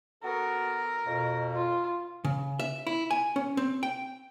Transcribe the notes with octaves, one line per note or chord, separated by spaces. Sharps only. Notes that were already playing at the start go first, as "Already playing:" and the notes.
B3 F#4 A4 A#4
F2 B2
F4
C#3
E5
E4
G#5
C#4
C4
G5